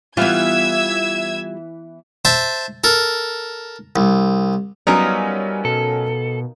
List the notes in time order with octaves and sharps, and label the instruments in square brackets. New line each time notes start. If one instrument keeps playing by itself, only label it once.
[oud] E3 B3 [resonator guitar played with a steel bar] G3 F4 [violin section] E5 E6 G#6
[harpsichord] C5 E5 A5
A4 A#4
C2
[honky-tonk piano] F#3 B3 C#4 [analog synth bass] G3 [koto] D#4 F4 A#4
[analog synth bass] B2 [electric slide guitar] A4